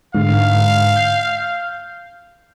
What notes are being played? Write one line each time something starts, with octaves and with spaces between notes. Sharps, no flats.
G#2 D3 F5
G6